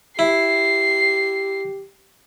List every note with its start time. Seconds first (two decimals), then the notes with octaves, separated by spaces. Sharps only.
0.19 E4 G4 C7